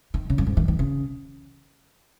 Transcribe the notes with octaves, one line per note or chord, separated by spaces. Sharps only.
D#3
C#3
F#2
G#2
D#3
D#3
C#3